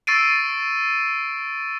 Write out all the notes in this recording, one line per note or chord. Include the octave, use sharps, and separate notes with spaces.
C#6 E6 A6 C7 D7 D#7